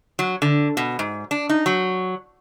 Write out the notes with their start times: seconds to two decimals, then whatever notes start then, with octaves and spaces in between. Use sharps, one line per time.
0.19 F#3
0.42 D3
0.77 B2
0.99 G#2
1.31 D4
1.50 D#4
1.66 F#3